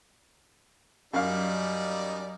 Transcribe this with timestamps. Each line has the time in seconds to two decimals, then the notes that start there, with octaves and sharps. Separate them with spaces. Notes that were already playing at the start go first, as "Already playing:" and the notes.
1.14 F#2 F#3 G3 D#4 D5 F5